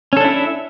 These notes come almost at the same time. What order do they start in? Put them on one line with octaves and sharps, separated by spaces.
C#4 A4 D4 E4 E5